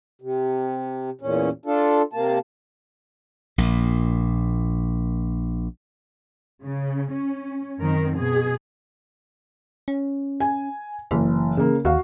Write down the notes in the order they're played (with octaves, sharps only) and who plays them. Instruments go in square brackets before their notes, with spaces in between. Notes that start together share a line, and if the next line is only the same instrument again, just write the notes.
[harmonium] C3
E2 A#2 C#4
D4 F4 A4
C3 A#3 A5
[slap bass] A#1 A#2
[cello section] C#3
C#4
F#2 D#3 C4 A#4
B2 G#4
[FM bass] C#4
[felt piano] G#5
[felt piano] F#1 [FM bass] E3
[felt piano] C#3 A#3
[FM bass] D#2 [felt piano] F#4 F5